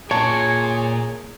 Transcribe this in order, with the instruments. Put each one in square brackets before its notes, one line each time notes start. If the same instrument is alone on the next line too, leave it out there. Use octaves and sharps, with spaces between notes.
[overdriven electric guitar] A#2 [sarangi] G#4 [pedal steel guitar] C#5 [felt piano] A5